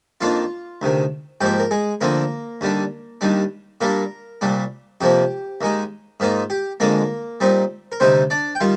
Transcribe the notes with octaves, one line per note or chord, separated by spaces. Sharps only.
F2 D#3 A#3 D4 F4 F5
D2 C3 D#3
G#2 F3 A#3 G4 G5
A#4
G#3 G#4
D2 D3 F3 A#3 C4 A#4
D#2 D3 G3 D4
D#2 D#3 G3 D4
A#2 G3 A#3 D4 A#4
C2 A#2 G3 D4
F2 C3 F3 A#3 G4
D#2 D#3 G#3 D#4
G#2 D#3 A#3 D#4 F4
G4
F2 D3 G#3 A#3 D4 A#4
A#2 G3 C4 D#4
A#4
D2 C3 G3 C4 D#4 C5
D4 D5
G5
D#3 G3 F4 F5